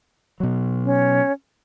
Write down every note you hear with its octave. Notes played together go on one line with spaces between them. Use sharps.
B2 F#3
C#4